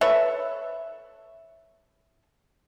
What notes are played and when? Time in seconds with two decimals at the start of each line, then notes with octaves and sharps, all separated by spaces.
0.01 A4 B4 C#5 E5